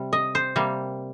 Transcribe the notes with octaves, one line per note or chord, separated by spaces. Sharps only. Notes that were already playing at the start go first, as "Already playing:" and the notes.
Already playing: C3 G3
D#5
C5
C3 G3 A#3